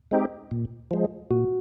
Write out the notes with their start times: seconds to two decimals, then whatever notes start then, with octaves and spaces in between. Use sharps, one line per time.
0.11 G#3 C4 D#4 G4
0.51 A#2
0.91 F3 G#3
1.31 A#2 F#4